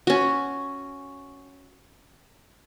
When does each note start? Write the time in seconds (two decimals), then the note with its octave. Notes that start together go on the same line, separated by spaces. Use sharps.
0.07 C#4 F#4